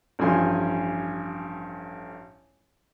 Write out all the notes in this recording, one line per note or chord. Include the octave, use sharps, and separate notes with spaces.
A1 G2 F3 G#5 C6